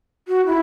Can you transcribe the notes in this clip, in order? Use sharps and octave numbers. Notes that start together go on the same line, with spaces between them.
F#4
E4